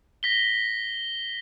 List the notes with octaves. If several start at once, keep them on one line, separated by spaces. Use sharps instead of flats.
A#6 B6 G7